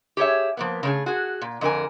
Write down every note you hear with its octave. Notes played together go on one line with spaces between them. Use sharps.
G4 G#4 C#5 E5
F3 A#3 B3
C#3 A3 G#4
F#4 G#4
A#2
F2 D3 A#4 G#5